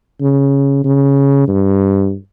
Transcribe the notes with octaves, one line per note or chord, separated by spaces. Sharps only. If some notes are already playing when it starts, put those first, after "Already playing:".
C#3
C#3
G2